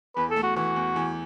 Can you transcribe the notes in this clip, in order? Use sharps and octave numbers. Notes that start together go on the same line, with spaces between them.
E2 B4
A4
A3
F#4
E3 F#4
E2
E2